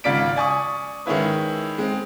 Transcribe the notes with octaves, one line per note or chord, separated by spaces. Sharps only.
G#1 C#3 F4 D5 B6 D7
D5 G#5 C#6 D#6
D#3 G#3 C#4 E4 B4
G#3 C4